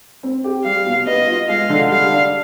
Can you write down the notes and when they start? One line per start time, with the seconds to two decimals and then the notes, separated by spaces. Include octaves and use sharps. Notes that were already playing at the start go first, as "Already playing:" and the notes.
0.23 C4
0.44 G4
0.65 G3 F5
0.86 B2
1.07 B3 D#5
1.28 F4
1.49 G#3 F5
1.69 D3
1.91 G3 F5
2.11 D4